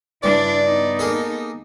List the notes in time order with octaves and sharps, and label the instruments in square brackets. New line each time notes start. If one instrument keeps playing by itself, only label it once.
[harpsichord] G2 C#3 [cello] D4 E4 [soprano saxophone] D5
[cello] B3 D#4
[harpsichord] A#3 G#4 A4